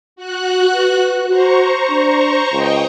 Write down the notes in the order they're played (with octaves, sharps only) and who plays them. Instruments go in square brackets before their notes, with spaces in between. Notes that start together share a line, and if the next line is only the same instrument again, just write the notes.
[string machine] F#4 F#6
[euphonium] B4
[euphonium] F#4 [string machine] C5 A#5 C#6
[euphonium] D4
[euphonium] C#2 [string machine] D#5 G5